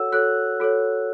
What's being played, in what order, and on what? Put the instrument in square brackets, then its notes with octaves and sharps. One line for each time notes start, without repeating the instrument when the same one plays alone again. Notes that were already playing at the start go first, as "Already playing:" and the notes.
Already playing: [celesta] F#4 A4 C#5 F#5 E6
F#4 A4 C#5 F#6
F#4 A4 C#5